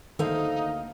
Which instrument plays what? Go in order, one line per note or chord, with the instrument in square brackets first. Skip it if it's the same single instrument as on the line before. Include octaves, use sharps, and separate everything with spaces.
[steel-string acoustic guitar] D2 A#3 F5 [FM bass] D#3 [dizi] D#4 [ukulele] A4 C5 E5